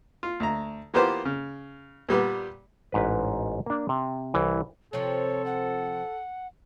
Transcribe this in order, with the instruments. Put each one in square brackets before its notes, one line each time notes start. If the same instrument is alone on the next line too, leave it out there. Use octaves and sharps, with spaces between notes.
[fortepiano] F4
D2 A#5
E3 A#3 B3 F4 G4 C5
C#3
A#2 G3 B3 G4
[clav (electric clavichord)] A1 G#2 B4
A#3 D4
C3
C2 E3
[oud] C3 F3 [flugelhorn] A4 [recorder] C#5
[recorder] F#5